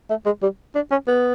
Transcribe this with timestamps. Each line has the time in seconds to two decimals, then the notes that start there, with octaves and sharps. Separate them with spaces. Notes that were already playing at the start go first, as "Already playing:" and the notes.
0.10 A3
0.26 G#3
0.43 G3
0.75 D4
0.91 C#4
1.07 B3